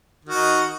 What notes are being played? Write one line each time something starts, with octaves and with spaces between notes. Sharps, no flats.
D#3 D#4 F#4